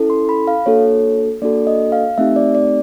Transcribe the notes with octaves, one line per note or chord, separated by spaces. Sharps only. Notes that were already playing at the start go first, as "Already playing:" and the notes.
Already playing: C#4 E4 A4
C6
B5
F5
A#3 D4 F#4 A4 C#5
A#3 D4 F#4 A4 D5
D#5
F5
A3 C4 D#4 G4 E5
D5
D5